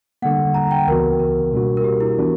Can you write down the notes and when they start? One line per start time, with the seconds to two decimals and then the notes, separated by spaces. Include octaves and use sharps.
0.22 D3 G3 A#3 F#5
0.54 A#5
0.71 G5
0.87 C#2 C#3 E3 B3 F#4 A#4
1.20 A#4
1.52 B2 G3 A#3 D4 F#4
1.77 A#4
1.84 G4
2.00 E4
2.18 E3 B3 D4 F#4